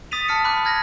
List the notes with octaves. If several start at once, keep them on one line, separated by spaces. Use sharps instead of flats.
D#6 A6 B6 D#7 F7
A5 F6 B6 C#7
B5 D6 F#6
F6 G#6 A#6